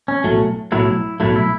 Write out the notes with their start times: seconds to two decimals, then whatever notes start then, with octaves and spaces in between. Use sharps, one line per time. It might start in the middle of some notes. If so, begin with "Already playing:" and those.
0.08 C#4
0.24 B1 A2 F#3 A3
0.72 B1 A2 F#3 A3 E4
1.20 B1 A2 F#3 A3 E4
1.36 E4